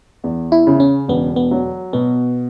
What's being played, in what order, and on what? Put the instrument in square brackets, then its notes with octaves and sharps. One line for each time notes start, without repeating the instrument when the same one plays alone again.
[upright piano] E2
[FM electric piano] E4
[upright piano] C#3
[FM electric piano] C#4
[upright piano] E1 [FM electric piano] B3
[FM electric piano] B3
[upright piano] F#3
[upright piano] B2 [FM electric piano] B3